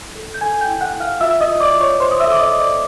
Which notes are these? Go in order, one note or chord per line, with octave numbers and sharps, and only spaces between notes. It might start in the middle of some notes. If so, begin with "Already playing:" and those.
Already playing: E4
A4
G6
A4 G#5 G#6
G5 G6
E4
F#5 F#6
E4
F5 F6
F4 E5 E6
D#5 D#6
F4
D5 D6
F4
C#5 C#6
C5 C#5 C6
D#6
E5 E6
A4
D6
D#5 D#6
A4
D5 D6